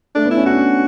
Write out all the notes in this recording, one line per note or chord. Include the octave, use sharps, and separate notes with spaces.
A3 D4
B3
E4
C#4
D4 F#4